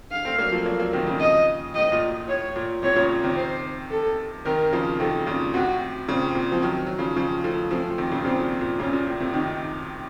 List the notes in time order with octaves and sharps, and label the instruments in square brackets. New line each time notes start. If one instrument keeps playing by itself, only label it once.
[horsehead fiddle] F5
[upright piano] A3 C4
F#3 A#3
F3 A3
F#3 A#3
F#3 A#3
C3 D#3
C#3 F3
[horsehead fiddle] D#5
[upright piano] A2 [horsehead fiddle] D#5
[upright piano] A#2
A#2
[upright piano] A2 [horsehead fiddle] C#5
[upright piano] A#2
[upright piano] A2 C3 [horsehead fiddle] C#5
[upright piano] A#2 C#3
C3 D#3
[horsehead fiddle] C5
A4
[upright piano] C3 D#3 [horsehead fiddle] A#4
[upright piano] C#3 F3
[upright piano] C3 D#3 [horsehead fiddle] A4
[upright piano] A#2 C#3
[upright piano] A2 C3 [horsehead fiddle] F#4
[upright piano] A#2 C#3 [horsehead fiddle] C4
[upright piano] A#2
F3
D#3 F#3
F#3
C#3 F3
C#3 F3
F3 A3
[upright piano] F3 A3 [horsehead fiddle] C4
[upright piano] F3
C3 D#3
A#2 C#3
[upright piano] A#2 C#3 [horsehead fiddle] C4
[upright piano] A#2
A#2
[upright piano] A#2 C#3 [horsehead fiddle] C#4
[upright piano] C3
A#2
A2 C3
A2 C3
[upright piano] C3 D#3 [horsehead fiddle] D#4